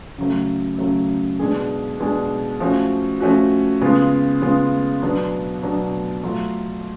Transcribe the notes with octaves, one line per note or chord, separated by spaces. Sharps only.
C#3 F#3 A3
C#3 F#3 A3
B2 G#3 D4 G#4
B2 G#3 D4 G#4
F3 A3 C#4 F#4
F3 A3 C#4 F#4
C#3 G#3 B3 F4
C#3 G#3 B3 F4
B2 F#3 B3 D4
B2 F#3 B3 D4
F#3 A3 F4